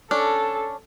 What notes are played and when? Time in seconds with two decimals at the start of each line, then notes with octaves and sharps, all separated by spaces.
0.11 C#4 D4 A4